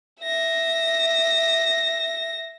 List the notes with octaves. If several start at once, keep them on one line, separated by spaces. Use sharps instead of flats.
E5 A#6